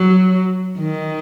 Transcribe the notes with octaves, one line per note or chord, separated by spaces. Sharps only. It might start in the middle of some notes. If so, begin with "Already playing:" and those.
Already playing: F#3
D#3